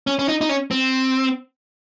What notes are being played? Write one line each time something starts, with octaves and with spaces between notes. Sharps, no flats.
C#4
C#4
D#4
D#4
C#4
C4